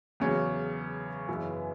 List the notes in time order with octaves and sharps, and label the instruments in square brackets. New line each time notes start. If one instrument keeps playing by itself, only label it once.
[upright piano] E2 C#3 F#3 C#4
F#2 C#3 E3 B3 E4